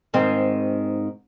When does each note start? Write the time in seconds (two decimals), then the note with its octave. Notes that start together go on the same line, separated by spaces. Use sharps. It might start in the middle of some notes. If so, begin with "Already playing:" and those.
0.14 G#2 D#3 C4